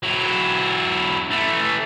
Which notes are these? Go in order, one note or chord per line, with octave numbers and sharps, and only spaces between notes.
F#3 E4
E3 A3